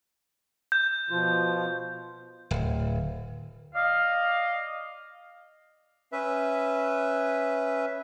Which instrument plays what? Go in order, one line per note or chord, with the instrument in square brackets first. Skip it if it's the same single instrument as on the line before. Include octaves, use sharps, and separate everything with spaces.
[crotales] G6
[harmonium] B2 F3 F4
[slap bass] D1
[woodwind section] D5 D#5 F5
[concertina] C#4 B4 E5